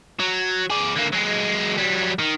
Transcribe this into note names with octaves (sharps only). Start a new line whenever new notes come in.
F#3
G#4 D5
D3 A#3
F#3 G#3
F#3 G3
D#3